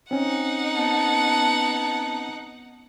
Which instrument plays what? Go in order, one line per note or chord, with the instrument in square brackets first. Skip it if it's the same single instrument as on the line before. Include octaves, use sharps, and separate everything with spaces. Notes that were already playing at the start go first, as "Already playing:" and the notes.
[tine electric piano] C4 C#4 [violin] D#4 F#5
[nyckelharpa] B3 [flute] A5